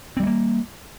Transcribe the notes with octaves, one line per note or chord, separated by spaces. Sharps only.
G3 A3 A#3 C4